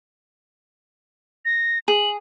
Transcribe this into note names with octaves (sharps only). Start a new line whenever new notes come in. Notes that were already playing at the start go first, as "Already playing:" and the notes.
A#6
G#4 F#7